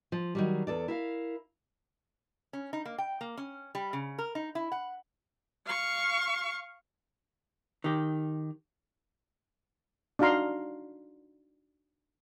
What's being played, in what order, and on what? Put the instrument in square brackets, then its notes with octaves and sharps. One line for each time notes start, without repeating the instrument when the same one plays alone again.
[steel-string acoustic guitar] F3
D#3 F#3 G3
E2 A4 D5
E4 A#4 F5
[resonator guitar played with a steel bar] C#4
D#4
A#3
G5
A#3
C#4
G3
C#3
A#4
D#4
E4
F#5
[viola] F5 C#6
[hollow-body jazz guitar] D#3 G4
[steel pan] D4 D#4 F#4 F5 A#5 C6